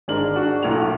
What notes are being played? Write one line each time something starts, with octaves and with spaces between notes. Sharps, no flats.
G#1 G#3 D4 A#4 F#7
D4 F#4
B1 A2 A#3 F#5 F7